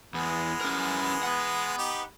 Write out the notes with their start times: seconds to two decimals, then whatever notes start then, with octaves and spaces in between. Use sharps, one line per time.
0.14 E2 E3 G#3 B3
0.61 C#4 A#4
1.23 F#5 B5
1.78 D#4 G4